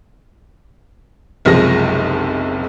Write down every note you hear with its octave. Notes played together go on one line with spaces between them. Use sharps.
F#1 B1 C3 F3 G#3 A#6